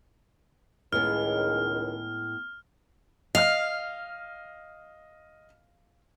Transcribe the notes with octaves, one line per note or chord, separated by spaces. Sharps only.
C#2 A2 D#3 G#3 B3 F6
D#5 F5 F6